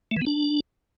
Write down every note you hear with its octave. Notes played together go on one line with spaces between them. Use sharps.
A3
E3
B3
D4